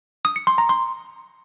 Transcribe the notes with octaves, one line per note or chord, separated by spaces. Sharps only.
D#6
C#7
C6
A#5
C6